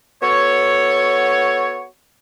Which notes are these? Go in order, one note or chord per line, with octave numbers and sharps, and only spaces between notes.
B3 F#4 A4 C#5